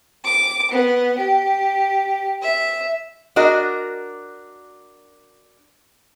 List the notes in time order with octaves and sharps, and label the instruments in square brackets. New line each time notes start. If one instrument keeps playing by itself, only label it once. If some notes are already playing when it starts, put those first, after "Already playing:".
[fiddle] D6
B3
G4
E5
[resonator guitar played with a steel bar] D4 F#4 A#4 D#5